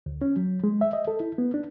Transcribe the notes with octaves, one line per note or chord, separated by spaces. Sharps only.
D2
C#4
F#3
G#3
E5
D#5
A4
E4
B3
D4